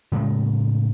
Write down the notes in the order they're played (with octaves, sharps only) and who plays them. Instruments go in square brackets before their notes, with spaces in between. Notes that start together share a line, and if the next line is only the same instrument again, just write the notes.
[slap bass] A2 C#3 G#3 A3